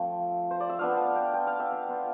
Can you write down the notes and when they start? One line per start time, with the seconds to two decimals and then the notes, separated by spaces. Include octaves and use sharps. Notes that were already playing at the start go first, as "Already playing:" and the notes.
Already playing: F3 A3 C4 G5
0.51 C5
0.60 D5
0.69 E5
0.79 B3 D4 F4 F5
0.97 A5
1.15 G5
1.34 G5
1.47 F5
1.60 E5
1.72 F5
1.88 B3 F4